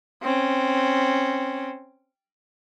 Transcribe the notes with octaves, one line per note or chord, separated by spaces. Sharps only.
C4 C#4